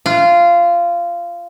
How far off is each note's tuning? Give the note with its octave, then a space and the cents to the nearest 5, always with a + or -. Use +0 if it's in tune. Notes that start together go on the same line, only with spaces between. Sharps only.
F4 -15